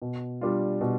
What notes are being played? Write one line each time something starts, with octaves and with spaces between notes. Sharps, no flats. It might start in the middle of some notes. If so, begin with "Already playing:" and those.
B2
G3 D4 F4
B2